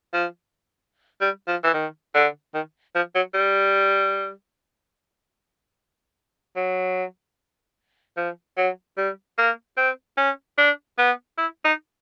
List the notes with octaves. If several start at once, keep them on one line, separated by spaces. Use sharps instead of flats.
F3
G3
F3
E3
D#3
D3
D#3
F3
F#3
G3
F#3
F3
F#3
G3
A#3
C4
C#4
D4
B3
E4
D#4